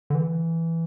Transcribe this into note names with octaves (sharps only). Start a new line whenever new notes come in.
D3
E3